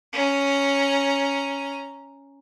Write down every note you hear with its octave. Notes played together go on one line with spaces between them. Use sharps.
C#4 A#5